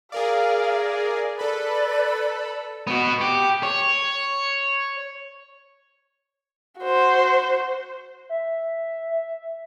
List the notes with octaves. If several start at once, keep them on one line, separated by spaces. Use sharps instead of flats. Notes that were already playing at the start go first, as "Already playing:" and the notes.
G#4 A#4 D5 F5
A4 B4 D5 B5
B3 F#4
G4
C#5
F#4 C5
E5